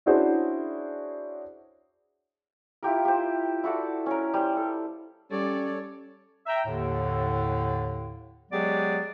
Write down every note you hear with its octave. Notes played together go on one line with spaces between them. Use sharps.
C#4 D4 E4 F#4 G#4 C5
E4 F4 G4 A#4
G4 C5
E4 F#4 A4 D5
C#4 A#4
G3 C5
A4
G3 C#4 A4 C#5 D5
E5 G5 A#5
D#2 A2 D3
F#3 G#3 B3 G4 G#4 D5